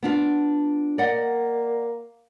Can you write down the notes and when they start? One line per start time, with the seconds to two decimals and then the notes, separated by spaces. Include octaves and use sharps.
0.03 B3 D4 F4
0.98 A#3 D5 D#5 F#5